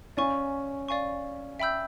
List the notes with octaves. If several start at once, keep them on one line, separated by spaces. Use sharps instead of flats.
C#4 D5 F5 G#5 C#6
D5 F5 G#5 C#6
E5 G5 B5 E6 G6